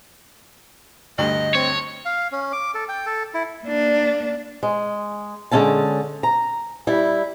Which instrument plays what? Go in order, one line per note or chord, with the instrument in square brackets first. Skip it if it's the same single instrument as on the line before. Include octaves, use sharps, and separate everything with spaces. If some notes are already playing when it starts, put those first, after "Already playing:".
[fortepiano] D2 G2 [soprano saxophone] D#5
[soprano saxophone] C4 [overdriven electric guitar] C#5
[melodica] F5
C#4
D6
A4
G5
A4
E4
[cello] A#3 D4
[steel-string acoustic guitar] G#3
D3 G#3 C#4 F4 A5
A#5
G3 E4